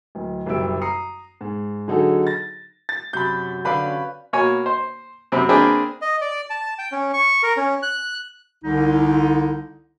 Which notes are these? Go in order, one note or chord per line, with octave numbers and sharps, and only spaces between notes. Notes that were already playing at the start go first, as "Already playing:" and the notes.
D1
F#1 B1 G3 E5 E6 D7
A#5 D#6 C7 C#7
G#2
D3 F#3 D#4 F#4 G#4 A4
A6 A#6
A6
F#2 C3 B5 G6
D3 B4 D5 F5 B5
C#4
B2 A#3 C#5 G#5
C5
F#2 C3 C4 B5
A#3 C4 D4 G#4 B4 G5
D#5
D5
A5
G5
C#4
C#6
A#4
C#4
F#6
C2 D3 D#4